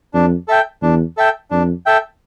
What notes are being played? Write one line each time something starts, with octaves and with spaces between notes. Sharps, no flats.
F2 D4
A4 E5 G5
E2 D4
A4 E5 G5
F2 D4
A4 E5 G5